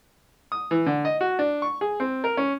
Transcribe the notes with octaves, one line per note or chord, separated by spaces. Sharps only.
D#6
E3
D3
D#5
F#4
D4
C#6
G#4
C4
A#4
C#4